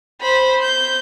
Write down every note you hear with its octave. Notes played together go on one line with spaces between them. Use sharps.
C5 B5
G6